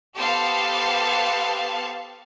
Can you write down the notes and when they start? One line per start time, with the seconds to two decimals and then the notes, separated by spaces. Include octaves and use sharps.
0.17 B3 G4 A4 C5 F5 A5